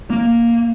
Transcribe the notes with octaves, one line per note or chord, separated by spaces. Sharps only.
A#3